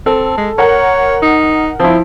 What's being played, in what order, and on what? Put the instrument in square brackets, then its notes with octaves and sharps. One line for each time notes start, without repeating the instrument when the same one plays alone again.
[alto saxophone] C4 [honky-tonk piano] A4
[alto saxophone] G#3
[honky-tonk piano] A#4 F#5 [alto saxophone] C#5
[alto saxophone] D#4
[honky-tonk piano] F3 E4 [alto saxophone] C4